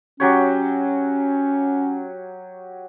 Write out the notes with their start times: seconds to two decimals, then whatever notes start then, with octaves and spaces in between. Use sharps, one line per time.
0.20 F#3 C#4 G4 C#5